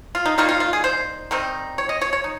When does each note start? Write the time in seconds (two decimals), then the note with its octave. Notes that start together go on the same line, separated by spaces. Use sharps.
0.15 F4
0.26 D#4
0.38 D#3 G3 A#3 D#4 F4
0.49 F4
0.60 F4
0.73 G#4
0.84 C5
1.31 D#3 G3 C4 D#4
1.78 C#5
1.89 D#5
2.01 C#5
2.13 C#5
2.24 D#4